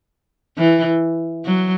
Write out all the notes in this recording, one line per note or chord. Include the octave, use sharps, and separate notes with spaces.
E3
F#3